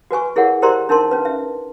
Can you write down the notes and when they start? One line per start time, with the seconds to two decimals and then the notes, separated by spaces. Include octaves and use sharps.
0.11 F#4 B4 G#5 C#6
0.36 E4 G#4 A#4 C#5 F#5
0.62 G4 A#4 C5 D5 A#5 C6
0.89 D4 D#4 A#4 A5 C6
1.11 C#4 B4
1.25 E5